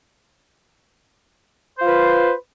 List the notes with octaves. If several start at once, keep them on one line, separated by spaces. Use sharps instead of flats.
F4 B4 C5